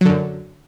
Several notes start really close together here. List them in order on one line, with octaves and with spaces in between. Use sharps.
F#3 D3 F#2